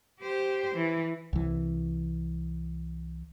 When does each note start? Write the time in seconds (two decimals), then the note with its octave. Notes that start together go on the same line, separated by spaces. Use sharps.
0.21 G4 C5
0.75 E3
1.33 C2 E3